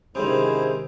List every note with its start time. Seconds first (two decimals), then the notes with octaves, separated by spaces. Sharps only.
0.15 G#2 C3 D#3 G#3 C#4 E4 G#4 C5